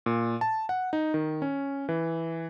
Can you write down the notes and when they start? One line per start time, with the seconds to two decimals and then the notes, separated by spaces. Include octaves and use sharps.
0.06 A#2
0.41 A5
0.69 F#5
0.93 D#4
1.14 D#3
1.42 C#4
1.89 E3